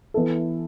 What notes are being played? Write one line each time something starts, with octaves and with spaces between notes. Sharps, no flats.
E3 B3 E4 A4